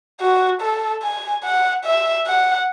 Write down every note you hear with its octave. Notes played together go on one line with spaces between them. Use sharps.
F#4
A4
G#5
F#5
E5
F#5